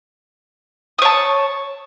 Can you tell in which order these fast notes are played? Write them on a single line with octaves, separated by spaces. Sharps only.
D#6 C#5 A5